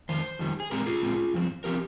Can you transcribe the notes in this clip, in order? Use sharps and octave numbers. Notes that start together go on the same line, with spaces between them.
F2 D#3 C5
F2 D#3 G3
G#4
A#2 G#3 C4 G4 A#4
F4 G#4
A#2 G#3 C4
G2 F3 C4
F3 C4 G4 A#4